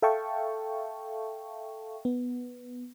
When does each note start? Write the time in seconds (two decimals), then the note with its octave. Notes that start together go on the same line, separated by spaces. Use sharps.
0.02 A4 E5 F5 G5 A5 C#6
2.05 B3